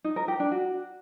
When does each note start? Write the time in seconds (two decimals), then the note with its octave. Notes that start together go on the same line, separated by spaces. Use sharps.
0.04 D#4
0.16 A#4
0.28 G4
0.40 D4
0.52 F#4